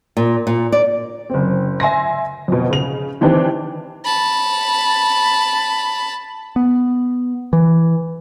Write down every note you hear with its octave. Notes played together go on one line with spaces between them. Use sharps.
A#2
A#2
D5
F#1 C4
E5 G#5 C6 A#6
F2 B2
C#3 F7
D#3 E3 C4 D4 G4
A5 B5
B3
E3